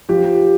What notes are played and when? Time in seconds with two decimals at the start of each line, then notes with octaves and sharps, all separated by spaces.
0.09 F3 G4